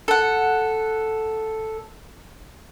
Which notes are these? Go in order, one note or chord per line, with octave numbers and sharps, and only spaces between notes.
A4 F#5